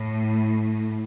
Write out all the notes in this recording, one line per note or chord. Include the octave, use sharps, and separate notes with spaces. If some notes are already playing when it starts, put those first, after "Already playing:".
Already playing: A2